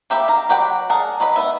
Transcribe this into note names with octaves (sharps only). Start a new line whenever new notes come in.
A#3 G4 E5 B5
F5 A#5
F#3 G4 F#5 G5 B5
G#4 A#4 D5 F#5 A5
F#3 B4 D#5 B5
B3 B4 E5